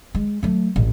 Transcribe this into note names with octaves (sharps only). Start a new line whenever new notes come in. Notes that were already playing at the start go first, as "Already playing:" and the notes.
G#3
F#3 A3
A1